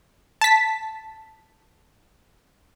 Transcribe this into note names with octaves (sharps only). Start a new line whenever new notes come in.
A5 B6